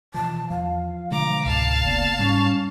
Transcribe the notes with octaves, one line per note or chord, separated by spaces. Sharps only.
B2 E3 F3 A5
E2 F3 F5
B2 D3 G#3 A#5 D6
C#2 G#2 B2 F5 A5
F1 C#3 A#3 B3 D5
G#2 G3 C#4